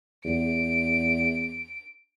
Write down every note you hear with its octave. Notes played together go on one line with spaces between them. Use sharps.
E2 D7